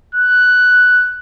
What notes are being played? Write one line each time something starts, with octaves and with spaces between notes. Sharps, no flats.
F#6